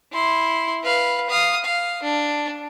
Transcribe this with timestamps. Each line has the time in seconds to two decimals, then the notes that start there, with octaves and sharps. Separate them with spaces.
0.12 E4 C6
0.83 B4 F5
1.30 F5 D#6
1.65 F5
2.03 D4